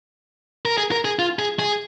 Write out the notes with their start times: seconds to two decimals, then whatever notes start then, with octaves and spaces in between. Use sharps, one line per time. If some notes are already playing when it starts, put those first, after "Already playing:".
0.65 A#4
0.78 G#4
0.92 A#4
1.05 G#4
1.19 F4
1.39 G#4
1.59 G#4